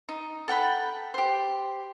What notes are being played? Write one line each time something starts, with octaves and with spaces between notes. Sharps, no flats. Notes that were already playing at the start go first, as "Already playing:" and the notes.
D#4
A4 F#5 G5 B5
G4 C5